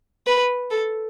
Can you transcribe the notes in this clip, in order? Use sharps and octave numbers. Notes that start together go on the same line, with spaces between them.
B4
A4